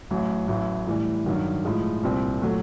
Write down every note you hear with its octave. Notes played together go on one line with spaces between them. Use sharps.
A1 A2 F#3
A1 A2 F#3
A2 E3 G3
G2 D#3 F#3
A2 F3 G#3
C2 A#2 G3 C4
A#2 F#3 A3